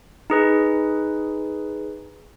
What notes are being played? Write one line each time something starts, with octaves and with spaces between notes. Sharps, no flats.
D#4 G#4 B4